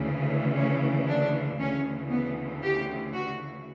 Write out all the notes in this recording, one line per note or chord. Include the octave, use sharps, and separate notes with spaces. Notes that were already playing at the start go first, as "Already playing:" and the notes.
Already playing: D2 C#3 E3
C#4
D4
D2 C#3 E3 C#4
B3
G4
F#4